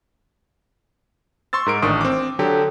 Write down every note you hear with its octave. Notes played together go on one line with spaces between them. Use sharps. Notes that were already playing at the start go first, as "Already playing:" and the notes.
C6 C#6 E6 A6
G#2 A#4 D7
A1 D#3 D4 C#6 D#6
C4 D6
D3 F#3 G4 A4